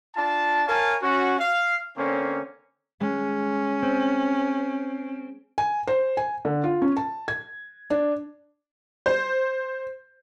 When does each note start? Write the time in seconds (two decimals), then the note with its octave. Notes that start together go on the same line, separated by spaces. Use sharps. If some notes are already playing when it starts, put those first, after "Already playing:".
0.16 D4 F4 A5
0.67 A#4 C#5 F5 G#5 A5
1.03 C#4 F#4
1.40 F5
1.97 D3 A#3 C4 C#4
3.01 G#3 C#4
3.83 C4
5.58 G#5
5.87 C5
6.17 G#5
6.45 D3
6.64 F4
6.82 C#4
6.97 A5
7.28 G#6
7.90 D4
9.06 C5